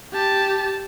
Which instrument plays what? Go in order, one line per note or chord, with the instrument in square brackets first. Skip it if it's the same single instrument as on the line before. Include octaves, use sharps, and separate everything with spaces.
[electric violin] G4 A5